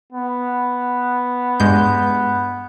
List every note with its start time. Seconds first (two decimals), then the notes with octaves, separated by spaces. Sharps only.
0.13 B3
1.60 G2 G#3 G6